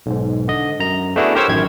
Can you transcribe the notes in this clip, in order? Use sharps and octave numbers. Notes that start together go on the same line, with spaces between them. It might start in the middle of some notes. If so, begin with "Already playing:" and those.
B1 G#2
D3 D#5
F#2 A#5
A3 B3 D4 E4 F#4 G#4
G4 A#4 C5 C#5 C#6 E6
A1 F#2 D#3 G#6